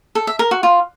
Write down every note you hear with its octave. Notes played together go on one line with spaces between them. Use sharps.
A4
E5
A#4
F#4
F4